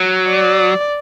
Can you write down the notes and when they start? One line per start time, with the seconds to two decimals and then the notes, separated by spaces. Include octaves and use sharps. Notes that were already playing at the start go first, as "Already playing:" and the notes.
Already playing: F#3
0.29 D5